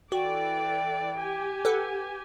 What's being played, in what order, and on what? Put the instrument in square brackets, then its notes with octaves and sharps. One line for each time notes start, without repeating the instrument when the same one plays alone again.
[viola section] E3 A4 D5 [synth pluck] F#4 [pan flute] G5
[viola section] G4 G#5
[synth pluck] A4 B4 F#5